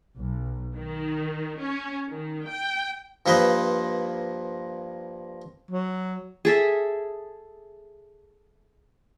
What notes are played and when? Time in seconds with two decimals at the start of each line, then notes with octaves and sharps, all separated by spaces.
0.19 B1
0.76 D#3
1.60 C#4
2.11 D#3
2.48 G5
3.26 G2 F3 A#3 B4 C5 D#5
5.71 F#3
6.45 G#4 A4 E5